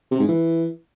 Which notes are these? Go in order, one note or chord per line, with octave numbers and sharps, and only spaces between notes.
C3
G#2
E3